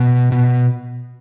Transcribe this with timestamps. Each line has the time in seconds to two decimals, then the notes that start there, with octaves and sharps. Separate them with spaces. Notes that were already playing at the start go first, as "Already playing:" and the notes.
Already playing: B2
0.32 B2